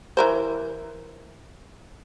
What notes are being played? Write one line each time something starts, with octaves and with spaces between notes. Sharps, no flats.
E3 A#4 C5